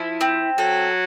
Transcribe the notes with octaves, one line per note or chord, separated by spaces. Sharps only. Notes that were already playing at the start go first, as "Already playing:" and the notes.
Already playing: F3 E4
C4
F#3 A4